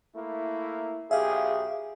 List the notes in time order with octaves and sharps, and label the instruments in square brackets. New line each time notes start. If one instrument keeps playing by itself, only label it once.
[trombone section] A3 A#3 E4
[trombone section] B1 G4 G#4 [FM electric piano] E5 F5